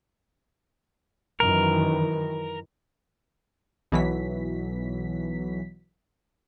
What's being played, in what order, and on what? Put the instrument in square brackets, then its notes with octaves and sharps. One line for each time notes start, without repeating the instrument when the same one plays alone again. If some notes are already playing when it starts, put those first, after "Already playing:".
[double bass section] F#2 D#3 E3 [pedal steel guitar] A#4
[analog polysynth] B1 B2 E3 F#3 B6